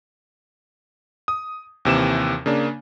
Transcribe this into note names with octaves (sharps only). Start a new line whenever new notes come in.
D#6
D#2 C3 E3 E7
C#3 A#3 D4